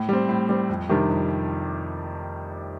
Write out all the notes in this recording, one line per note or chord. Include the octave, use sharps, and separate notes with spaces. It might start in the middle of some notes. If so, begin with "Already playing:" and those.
Already playing: A2
G3 C4
A2
G3 C4
F2
C3 D#3 G3 D4
F2